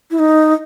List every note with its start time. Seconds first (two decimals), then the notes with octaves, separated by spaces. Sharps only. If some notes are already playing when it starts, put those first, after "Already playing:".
0.11 E4
0.19 D#4